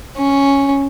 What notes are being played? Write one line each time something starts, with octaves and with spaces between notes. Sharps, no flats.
C#4